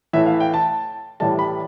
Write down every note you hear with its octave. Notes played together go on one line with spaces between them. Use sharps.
A2 E3 A3 E5
F5
G5
A5
A2 E3 G3 A5
B5